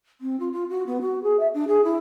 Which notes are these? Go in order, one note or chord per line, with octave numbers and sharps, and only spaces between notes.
C4
F4
F4
F#4
B3
F#4
G#4
E5
D4
G#4
E4